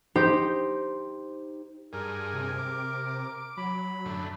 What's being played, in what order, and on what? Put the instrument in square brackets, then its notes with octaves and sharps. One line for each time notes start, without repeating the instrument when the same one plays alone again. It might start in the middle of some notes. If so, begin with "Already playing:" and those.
[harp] D#4 G4 C5
[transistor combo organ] G2 G#4 [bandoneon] A#4
[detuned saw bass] C3
[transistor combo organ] D6
[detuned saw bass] F#3 [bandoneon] B5
[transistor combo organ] F#2 A2 D3